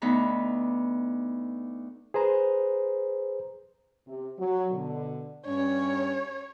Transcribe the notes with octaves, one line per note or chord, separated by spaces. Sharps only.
D2 B3 D#4 B5
G#4 B4 C5 A#5
C3
F#3
B2 D3
G2 C#4 C#5